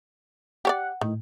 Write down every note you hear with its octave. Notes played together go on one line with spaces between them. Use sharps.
G4 C#5 D5 F#5
A2 D#3